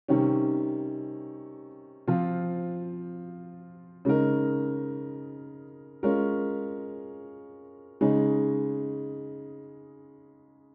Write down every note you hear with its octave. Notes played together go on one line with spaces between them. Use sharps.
C3 D#3 G3 C#4
F3 C4 F4
C#3 G#3 D#4 A#4
G#3 C#4 F4 A#4
C#3 G#3 D#4 G#4